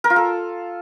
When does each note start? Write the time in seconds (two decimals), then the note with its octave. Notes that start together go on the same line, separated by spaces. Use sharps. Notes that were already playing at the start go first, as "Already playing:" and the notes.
0.04 A#4
0.10 F4
0.16 A4